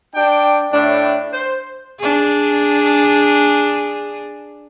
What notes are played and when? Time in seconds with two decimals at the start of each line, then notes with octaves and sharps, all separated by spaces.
0.15 D4 G5
0.72 A2 D4
1.32 C5
1.99 D4 G#4